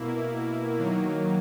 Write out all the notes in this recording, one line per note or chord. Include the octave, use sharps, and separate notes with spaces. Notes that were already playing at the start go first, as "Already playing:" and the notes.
Already playing: B2 A#3 E4
D#3 F#3 A#3